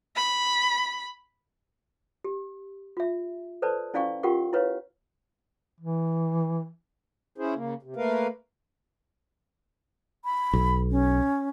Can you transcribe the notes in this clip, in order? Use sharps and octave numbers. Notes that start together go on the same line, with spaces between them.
B5
G4
F4 E5
A4 B4 C5 D5 A5
C#4 E4 D5 F5 G#5 C#6
F4 G4 A#4 F#5 G5 C#6
E4 B4 C#5 F5
E3
C#4 E4 G#4 C5
C#3 A#3
C3
A3 A#3 A#4 B4 F5
B5
B1
C#4